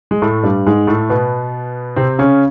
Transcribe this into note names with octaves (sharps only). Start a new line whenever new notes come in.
G#3
A2 A3
G2 G3
G#2 G#3
A2 A3
B2 B3
C3 C4
C#3 C#4